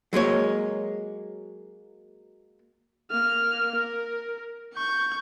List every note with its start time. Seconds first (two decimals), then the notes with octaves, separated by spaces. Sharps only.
0.13 F#3 G#3 A#3 C#5
3.11 A#3 F6
3.75 A#4
4.74 C#6 G6